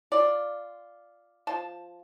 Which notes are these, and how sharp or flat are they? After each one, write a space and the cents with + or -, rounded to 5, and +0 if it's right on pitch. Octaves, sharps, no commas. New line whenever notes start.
F4 +0 D5 +0
F3 +0 A5 +0